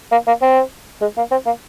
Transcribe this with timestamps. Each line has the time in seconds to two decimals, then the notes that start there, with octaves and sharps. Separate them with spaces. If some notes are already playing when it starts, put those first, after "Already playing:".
0.12 A#3
0.27 A#3
0.42 C4
1.01 G#3
1.17 A#3
1.31 C4
1.46 A#3